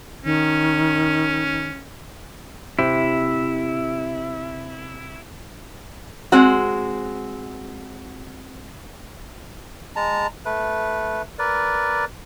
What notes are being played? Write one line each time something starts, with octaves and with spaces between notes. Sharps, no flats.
D#3 C#4
C3 E4
G#3 C4 F#4
G#3 A5 A#5
A3 B4
A#4 B4 D5